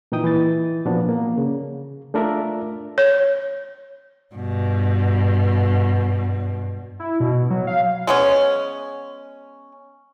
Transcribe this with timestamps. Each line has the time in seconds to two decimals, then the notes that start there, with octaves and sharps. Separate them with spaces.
0.12 A#2 E3 D#4 G5 D#6
0.24 E3 A6
0.85 A#2 F3 B3 D4 F#4
1.09 A#3
1.38 C#3
2.14 A3 D4 F4 A#4 D5 E5
2.98 C#5
4.35 G2 B2
7.00 E4
7.20 B2
7.50 F#3
7.67 F5
8.07 G#3 B3 C#4